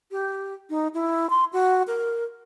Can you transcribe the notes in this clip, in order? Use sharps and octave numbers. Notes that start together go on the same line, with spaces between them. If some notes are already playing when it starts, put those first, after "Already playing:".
G4
D#4
E4
C6
F#4
A#4